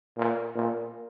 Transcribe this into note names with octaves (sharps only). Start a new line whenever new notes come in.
A#2
A#2